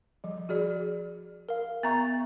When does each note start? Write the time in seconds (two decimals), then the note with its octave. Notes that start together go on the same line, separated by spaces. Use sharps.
0.24 F3 G3
0.49 F#4 G#4 D5
1.49 A#4 F5
1.83 B3 E5 A#5 C#6 A6